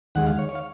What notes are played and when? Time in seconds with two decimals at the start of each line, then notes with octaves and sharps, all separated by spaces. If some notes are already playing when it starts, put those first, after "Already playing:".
0.15 D#2 D#3 G#3 F#5
0.27 F5
0.39 C#5
0.49 C#5
0.55 F5